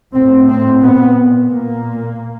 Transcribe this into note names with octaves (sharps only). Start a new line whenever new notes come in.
A2 C4
C4
A#2 B3
A#2 A#3